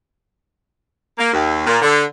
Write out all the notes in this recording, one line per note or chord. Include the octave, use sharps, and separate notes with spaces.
A#3
D#2
A#2
D3